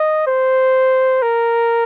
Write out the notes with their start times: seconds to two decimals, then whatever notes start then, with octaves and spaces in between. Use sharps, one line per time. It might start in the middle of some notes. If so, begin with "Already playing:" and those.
Already playing: D#5
0.27 C5
1.22 A#4